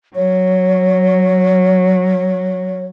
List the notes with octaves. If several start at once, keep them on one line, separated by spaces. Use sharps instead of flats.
F#3 C#5